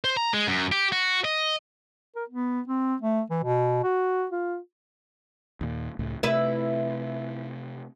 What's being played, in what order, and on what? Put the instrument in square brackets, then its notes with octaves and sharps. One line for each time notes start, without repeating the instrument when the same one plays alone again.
[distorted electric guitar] C5
A#5
G#3
F#2
G4
F#4
D#5
[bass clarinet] A#4
B3
C4
A3
E3
B2
F#4
F4
[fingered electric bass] D#2 A#2
C#2 A2
[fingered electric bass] C3 A3 C4 [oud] E4 B4 E5